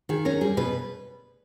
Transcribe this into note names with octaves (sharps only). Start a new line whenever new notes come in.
D#3 G#4
C#4 A#4
G3 G#4
B2 B4